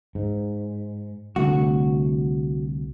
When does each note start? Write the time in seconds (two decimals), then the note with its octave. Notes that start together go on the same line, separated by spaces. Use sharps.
0.15 G#2
1.36 C2 D3 A3 F#4